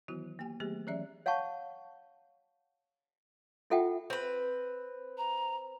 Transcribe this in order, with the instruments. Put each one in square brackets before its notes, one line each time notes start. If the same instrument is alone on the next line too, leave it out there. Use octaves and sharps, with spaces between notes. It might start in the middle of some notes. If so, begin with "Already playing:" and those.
[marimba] D#3 E3 F#3 B3 E4 F#4
A#3 G4 G5 G#5
D#3 F#3 A3 B3 G4 G#4
E3 F#3 C#4 G#4 D5 E5
[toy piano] C#5 F5 F#5 A5 C#6
E4 F4 A4 E5 F#5 G5
[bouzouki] C4 B4
[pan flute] A#5